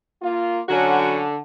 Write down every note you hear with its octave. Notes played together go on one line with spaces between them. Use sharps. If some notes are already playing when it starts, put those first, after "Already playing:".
A#3 F4
D3 F#3 C#4 F#4